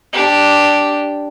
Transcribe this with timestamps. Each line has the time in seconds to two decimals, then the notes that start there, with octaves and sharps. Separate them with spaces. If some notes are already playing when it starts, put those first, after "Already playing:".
0.13 D4 G4